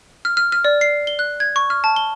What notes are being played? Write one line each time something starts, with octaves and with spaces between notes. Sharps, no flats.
F6
F6
F6
D5
C7
G7
F#6
G#6
C#6
F6
A5
G7